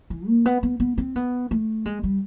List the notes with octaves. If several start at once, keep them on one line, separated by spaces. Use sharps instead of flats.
E3
A#3
B3
B3
B3
C4
B3
A3
G#3
G3